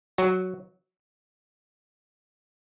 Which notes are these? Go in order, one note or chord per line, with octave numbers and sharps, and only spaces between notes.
F#3 F#4